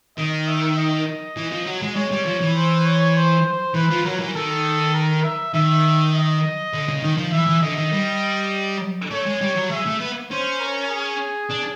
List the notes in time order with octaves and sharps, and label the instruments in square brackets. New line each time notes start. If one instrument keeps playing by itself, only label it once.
[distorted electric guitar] D#3 [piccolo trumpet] D#5
[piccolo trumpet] E5
D#5
[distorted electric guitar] E3
F3
F#3
G#3
[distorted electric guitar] G#3 [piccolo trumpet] C#5
[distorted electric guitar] G3
F3
E3
[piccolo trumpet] C5
C#5
C5
C5
[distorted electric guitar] E3 [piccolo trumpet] B4
[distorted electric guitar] F3
[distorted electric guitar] F#3 [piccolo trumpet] A#4
[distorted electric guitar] E3
[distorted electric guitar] D#3 [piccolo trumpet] A4
[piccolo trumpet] A#4
E5
[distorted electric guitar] D#3 [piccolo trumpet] E5
[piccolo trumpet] D#5
[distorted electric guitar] D3
C#3
D#3
F3
[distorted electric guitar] E3 [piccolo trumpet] E5
[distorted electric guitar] E3
[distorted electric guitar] D3 [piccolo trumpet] D#5
[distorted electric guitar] D#3
G3
[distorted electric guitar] A3 [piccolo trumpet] C#5
[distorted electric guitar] G#3
G3
F#3
[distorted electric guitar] G#3 [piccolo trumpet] E5
[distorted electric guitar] A3
B3
[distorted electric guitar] C#4 [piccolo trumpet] C5
[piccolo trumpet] A#4
G#4
[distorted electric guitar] D4